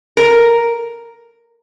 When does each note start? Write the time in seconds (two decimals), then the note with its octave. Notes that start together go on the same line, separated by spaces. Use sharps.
0.17 A#4